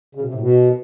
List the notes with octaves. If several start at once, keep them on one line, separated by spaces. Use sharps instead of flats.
C#3
B2
C3
A2
B2